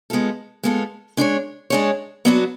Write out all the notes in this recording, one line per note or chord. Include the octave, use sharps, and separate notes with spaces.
G#3 B3 F4 A4
G#3 B3 F4 A4
G#3 D4 G#4 C#5
G#3 D4 G#4 C#5
F#3 B3 D4 F#4 B4